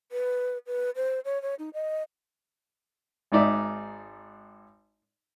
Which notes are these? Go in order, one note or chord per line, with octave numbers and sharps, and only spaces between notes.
B4
B4
C5
C#5
C#5
D#4
D#5
G#1 G#2 D#4 D5 E5